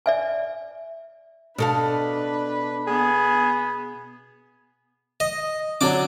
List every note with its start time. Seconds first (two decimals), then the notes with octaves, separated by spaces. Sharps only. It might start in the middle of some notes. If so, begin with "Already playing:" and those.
0.06 D5 E5 G#5
1.58 B2 D4 A4 B4 F5
2.87 B3 G#4
5.20 D#5
5.81 D3 F#3 D4 D6